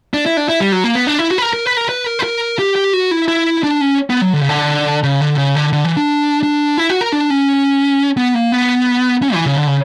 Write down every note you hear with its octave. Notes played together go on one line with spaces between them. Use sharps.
D4
E4
D4
E4
G3
F#3
A#3
B3
D4
E4
F#4
B4
A#4
A#4
B4
A#4
B4
A#4
B4
A#4
G4
G4
F#4
E4
E4
D4
C#4
B3
F#3
D3
C#3
D3
C#3
D3
C#3
D3
D3
E3
D4
D4
E4
F#4
A#4
D4
C#4
B3
A#3
B3
C#4
E3
C#3
D3
C#3